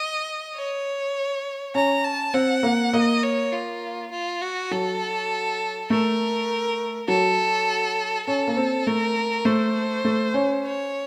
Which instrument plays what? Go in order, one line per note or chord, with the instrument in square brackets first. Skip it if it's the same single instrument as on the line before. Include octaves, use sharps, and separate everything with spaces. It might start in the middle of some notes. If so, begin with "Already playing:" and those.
Already playing: [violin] D#5
C#5
[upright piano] C#4 [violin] A#5
[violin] A5
[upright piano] C4 [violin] F#5
[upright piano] A#3
[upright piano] A#3 [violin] D#5
[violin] C#5
F4
F4
F#4
[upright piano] F#3 [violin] A4
[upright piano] A3 [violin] A#4
[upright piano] F#3 [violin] A4
[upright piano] C#4 [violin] A4
[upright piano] A#3
C4
[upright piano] A3 [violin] A#4
[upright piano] A3 [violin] C5
[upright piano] A3
C#4
[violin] C#5